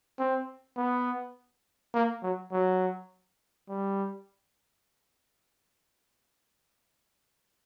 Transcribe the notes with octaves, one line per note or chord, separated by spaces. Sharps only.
C4
B3
A#3
F#3
F#3
G3